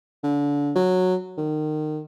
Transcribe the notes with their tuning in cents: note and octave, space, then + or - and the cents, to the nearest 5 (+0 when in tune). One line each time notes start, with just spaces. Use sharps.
D3 -30
F#3 -10
D#3 -25